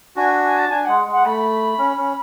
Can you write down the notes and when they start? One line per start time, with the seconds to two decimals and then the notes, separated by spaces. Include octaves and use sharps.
0.16 D4 F#4 G#5
0.44 G#5
0.57 A5
0.70 D4 G#5
0.84 G#3 F#5
1.06 G#3 F#5
1.25 A3 B5
1.78 C#4
1.97 C#4